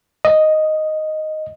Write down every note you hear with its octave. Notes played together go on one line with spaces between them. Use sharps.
D#5